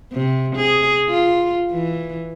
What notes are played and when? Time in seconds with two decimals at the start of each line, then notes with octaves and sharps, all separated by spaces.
0.13 C3
0.56 G#4
1.09 F4
1.71 E3